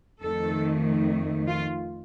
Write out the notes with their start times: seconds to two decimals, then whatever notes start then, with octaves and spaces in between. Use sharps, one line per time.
0.23 F2 D#3 A3 A4
1.47 F4